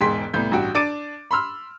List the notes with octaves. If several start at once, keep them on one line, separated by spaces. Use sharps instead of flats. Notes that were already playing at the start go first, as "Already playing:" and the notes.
E1 G#2 G#4 G5 C6 B6
C2 A2 B3 G6
A1 G2 F#4 G5
D4 D5 D6 A6 D7 D#7
B5 C6 E6 F6